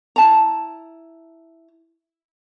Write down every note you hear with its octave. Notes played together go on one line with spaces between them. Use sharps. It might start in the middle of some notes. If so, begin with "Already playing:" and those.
E4 A5 A#5